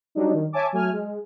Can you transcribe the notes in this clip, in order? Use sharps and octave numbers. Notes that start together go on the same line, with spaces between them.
F#3 G3 D4 D#4
D#3
C#5 E5 G#5 A5 D6
F#3 A3 G#5 F6
G#3